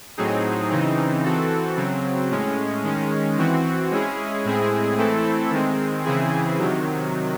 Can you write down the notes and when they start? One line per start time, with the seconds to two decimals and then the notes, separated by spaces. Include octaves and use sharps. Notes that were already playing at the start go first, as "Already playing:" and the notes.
0.17 A2 F#3 C4 D#4 G#4
0.70 C#3 E3 C4 D#4
1.24 E3 C4 F#4 A4
1.77 C#3 F#3 C4
2.31 A2 G#3 C#4
2.84 D#3 G#3 C#4
3.38 E3 C4 F#4
3.91 G#3 C#4 E4 G#4
4.44 A2 G#3 C4 E4 G#4
4.98 E3 A3 C4 E4 A4
5.51 D#3 G#3 C4
6.05 C#3 E3 C4 E4 G#4
6.58 C3 D#3 F#3